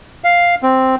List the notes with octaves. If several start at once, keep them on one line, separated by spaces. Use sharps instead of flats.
F5
C4